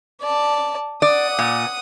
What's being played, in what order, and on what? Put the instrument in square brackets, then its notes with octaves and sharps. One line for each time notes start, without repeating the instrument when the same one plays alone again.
[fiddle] D5 A5
[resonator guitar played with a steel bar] D5 [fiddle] F#5 D#6
[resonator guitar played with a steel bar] A#2